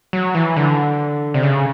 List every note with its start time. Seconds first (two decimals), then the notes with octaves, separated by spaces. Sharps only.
0.13 F#3
0.35 E3
0.57 D3
1.34 C3
1.43 C#3